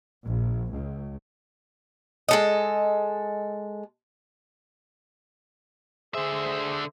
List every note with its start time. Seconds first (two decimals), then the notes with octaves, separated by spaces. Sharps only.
0.24 A#1
0.72 C#2
2.29 G#3 A4 D#5
6.14 D3 G#4 C5 E5